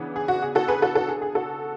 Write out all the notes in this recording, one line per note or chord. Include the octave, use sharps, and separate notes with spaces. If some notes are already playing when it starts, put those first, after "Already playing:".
Already playing: C#3 E3 B3 D4
G#4
F#4
G#4
F#4 A4
G#4 B4
F#4 A4
F#4 A4
G#4
G#4
F#4 A4